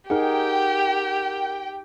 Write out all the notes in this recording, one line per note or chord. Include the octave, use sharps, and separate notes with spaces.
D#4 G4 G#4 A#4 F#5 G5